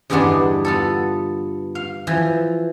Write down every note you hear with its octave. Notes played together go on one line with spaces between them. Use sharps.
E2 G2 D3 G#3 B3 D4
B3 F4 A4
F5
E3 F3